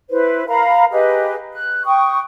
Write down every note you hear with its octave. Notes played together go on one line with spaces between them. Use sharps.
E4 B4 C5
A#4 F5 A#5 B5
G4 G#4 B4 D#5
F#6
G5 C#6 D#6